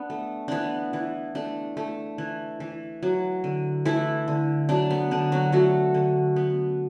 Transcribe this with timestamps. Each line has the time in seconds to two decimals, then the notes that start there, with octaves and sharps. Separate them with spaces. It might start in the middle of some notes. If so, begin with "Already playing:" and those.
Already playing: B3 D4
0.10 A3
0.48 E3 B3 D4
0.93 E3
1.35 A3 D4
1.77 A3
2.18 E3
2.60 E3
3.03 F#3
3.44 D3
3.85 E3 A3 E4
4.28 D3
4.69 F#3 D4
4.91 B3
5.11 D3 D4
5.32 F#3 F#4
5.52 F#3 A3 F#4
5.94 D3
6.36 B3